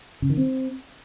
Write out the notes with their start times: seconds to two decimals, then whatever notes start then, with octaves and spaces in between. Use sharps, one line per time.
0.22 C#3
0.30 D#3
0.37 C4